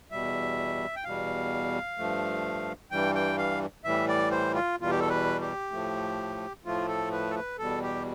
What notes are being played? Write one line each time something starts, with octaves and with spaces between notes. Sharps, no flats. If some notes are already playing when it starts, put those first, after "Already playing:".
E2 B2 G3 E5
G5
E2 B2 G3 F5
G2 F3 A3
G2 E3 G3 G5
G5
F5
A2 E3 G3 E5
D5
C5
F4
E2 B2 G3 F4
G4
A4
B4
G4
A2 F3 A3
A2 F3 A3 F4
A4
B4
A4
B4
E2 B2 G3 A4
G4